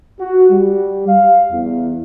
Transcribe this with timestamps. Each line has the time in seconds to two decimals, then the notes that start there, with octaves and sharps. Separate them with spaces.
0.21 F#4
0.51 G3
1.09 F5
1.52 E2